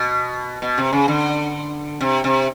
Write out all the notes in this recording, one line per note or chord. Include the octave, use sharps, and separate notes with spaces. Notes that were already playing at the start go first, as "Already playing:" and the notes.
Already playing: B2
B2
C3
C#3
D3
C3
C3